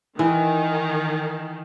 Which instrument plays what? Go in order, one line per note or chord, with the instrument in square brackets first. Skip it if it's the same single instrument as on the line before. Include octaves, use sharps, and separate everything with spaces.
[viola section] D#3 [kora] E3